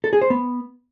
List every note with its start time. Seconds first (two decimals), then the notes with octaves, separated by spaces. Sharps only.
0.04 A4
0.13 G#4
0.22 C5
0.30 B3